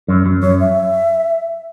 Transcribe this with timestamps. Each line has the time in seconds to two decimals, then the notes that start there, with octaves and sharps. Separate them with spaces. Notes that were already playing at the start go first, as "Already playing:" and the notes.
0.08 F#2
0.26 F#2
0.43 F#2 C#5
0.60 E5